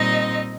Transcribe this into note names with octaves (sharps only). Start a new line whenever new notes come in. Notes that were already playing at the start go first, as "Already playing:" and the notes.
Already playing: A#2 G3 C4 D#4 D#5